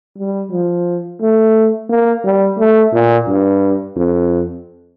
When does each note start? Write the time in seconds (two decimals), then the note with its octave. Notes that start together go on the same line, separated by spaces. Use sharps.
0.18 G3
0.52 F3
1.21 A3
1.90 A#3
2.24 G3
2.59 A3
2.93 A#2
3.27 G2
3.96 F2